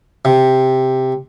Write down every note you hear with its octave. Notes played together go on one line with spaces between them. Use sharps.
C3